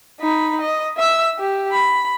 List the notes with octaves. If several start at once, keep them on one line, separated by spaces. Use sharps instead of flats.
D#4 B5
D#5
E5 E6
G4
B5